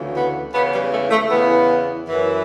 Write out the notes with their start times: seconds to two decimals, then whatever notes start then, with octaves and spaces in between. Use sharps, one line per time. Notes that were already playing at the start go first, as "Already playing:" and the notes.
Already playing: D2 C#3 E3
0.16 B3
0.54 E2 C#3 E3 B3
0.73 G3
0.91 A3
1.11 A3
1.30 E2 C#3 E3 B3
2.07 F#2 E3